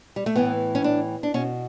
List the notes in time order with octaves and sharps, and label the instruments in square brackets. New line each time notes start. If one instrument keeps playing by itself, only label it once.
[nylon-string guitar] G3
A3
A2 E3 B3
C#4
D4
D4
B2 C#4